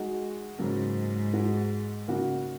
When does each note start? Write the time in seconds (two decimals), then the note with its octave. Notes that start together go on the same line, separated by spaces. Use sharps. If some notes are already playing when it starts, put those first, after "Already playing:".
Already playing: G#3 D#4 F#4
0.58 G#2 C#3 F#3 A#3
1.33 G#3 D#4 F#4
2.08 C#3 A#3 D#4 F#4